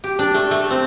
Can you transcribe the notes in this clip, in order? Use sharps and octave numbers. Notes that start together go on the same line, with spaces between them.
G4
D4
A3
A3
C4